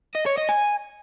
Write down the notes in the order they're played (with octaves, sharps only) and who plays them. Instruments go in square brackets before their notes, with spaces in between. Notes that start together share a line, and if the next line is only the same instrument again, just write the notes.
[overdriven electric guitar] D#5
C#5
D#5
G#5